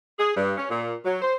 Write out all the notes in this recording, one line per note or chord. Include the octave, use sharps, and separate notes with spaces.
G#4
G2
C#4
A#2
F#3
C5